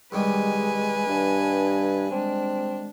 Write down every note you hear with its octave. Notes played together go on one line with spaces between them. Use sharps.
C2 D#3 G3 G#3 B4 G#5
G2 D4
G#3 C4 D4